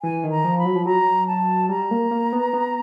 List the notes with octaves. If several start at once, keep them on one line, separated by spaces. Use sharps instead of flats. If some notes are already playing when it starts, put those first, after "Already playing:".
E3 G#5
D#3
A#5
F3
B5
F#3
F3
F#3 A#5
A5
G3 A#5
A#3
A#3
B3
B3